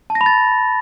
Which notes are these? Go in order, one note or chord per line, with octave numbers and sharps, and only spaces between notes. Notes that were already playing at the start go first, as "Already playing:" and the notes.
A5
A#6
B5
A6